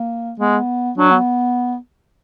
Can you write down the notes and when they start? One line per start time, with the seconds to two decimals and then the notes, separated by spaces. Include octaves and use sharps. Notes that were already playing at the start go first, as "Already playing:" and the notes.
Already playing: A#3
0.39 G#3 B3
0.97 F#3 D4
1.11 B3